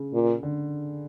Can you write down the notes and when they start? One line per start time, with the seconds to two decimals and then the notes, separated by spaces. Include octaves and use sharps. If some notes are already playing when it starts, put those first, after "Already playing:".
Already playing: C#3
0.13 A#2
0.43 D3